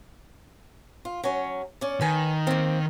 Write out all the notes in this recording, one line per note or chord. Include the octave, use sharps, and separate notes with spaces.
F4
F#3 C#4
C#4 D5
D#3 B4 G#5
A#3 C4